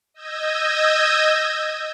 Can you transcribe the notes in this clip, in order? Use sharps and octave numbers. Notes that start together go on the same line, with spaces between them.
D#5 E6 G6 G#6 A#6 D#7